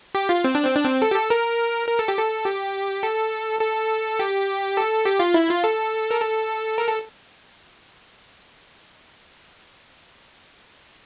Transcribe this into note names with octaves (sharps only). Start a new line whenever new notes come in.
G4
F4
C4
D4
C4
D4
C4
A4
G4
A4
A#4
A#4
A4
G4
A4
G4
A4
A4
G4
A4
G4
F4
E4
F4
A4
A#4
A4
A#4
A4